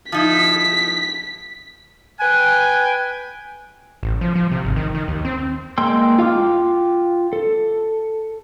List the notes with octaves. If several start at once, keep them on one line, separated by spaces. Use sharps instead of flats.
F3 D#4 E4 B6
B4 G5 G#5 F#6
A1
F3
F3
C3
G#1
D#3
D#3
D#2
C4
G#3 A#3 G5 C6 E6
F4 F5 G5 D6 F6
A4